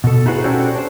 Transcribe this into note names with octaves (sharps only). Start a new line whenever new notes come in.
B2 A4
D#4 E4 F#4 G#4 B4
C#4 D4 F#4 G4 A4 C5
D4 C5